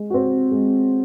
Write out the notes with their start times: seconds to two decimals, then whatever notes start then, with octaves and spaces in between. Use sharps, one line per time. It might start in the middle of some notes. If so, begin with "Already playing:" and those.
Already playing: G#3
0.10 C4 F#4
0.51 G#3